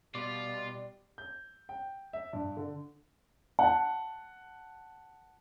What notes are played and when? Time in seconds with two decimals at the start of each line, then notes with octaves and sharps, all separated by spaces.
0.15 B2 G3 F4 D5
1.18 G6
1.69 G5
2.13 E5
2.33 G2
2.57 D3
3.59 F#5 A5